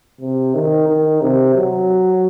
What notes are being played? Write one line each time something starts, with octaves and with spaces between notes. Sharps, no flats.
C3
D#3
D#3
C3
F#3